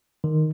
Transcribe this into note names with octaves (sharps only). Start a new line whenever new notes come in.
D#3